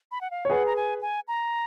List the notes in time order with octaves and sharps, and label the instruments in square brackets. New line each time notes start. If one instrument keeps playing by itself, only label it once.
[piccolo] B5
F#5
F5
[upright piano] C#5
[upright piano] G#4 B4 [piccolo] F#5
[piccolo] A#5
G#5
G#5
A#5